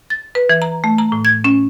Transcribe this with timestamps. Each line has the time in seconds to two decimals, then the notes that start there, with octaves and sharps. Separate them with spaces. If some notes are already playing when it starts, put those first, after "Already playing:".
0.10 A6
0.35 B4
0.50 E3
0.62 A#5
0.84 A3
0.98 A#5
1.12 A2
1.25 G#6
1.44 C#4